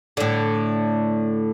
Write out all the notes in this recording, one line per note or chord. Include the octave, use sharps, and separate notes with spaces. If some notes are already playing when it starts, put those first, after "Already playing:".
A2 D3